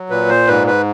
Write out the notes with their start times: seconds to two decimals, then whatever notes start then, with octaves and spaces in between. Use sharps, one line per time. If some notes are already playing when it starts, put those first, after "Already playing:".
Already playing: F#3
0.10 A#2 B4
0.29 C5
0.47 G#2 B4
0.67 B4